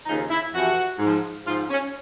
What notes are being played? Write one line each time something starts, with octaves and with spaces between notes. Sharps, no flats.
D#2 C#3 F3 D#4
E4
F2 C3 E3 F#4
G#2 F3
G#2 F3 F4
C#4